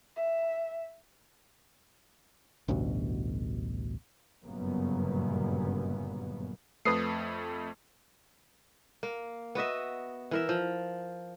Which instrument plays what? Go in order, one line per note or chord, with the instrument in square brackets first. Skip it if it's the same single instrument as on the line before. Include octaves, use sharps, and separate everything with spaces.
[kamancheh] E5
[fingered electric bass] A1 D2 G2 B2
[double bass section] G1 F#2 A#2 C#3 A#3 B3
[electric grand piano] F2 A3 [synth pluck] B4 D#6 C7
[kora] A#3
B3 F#4 D#5 E5
E3 A#4 E5
F3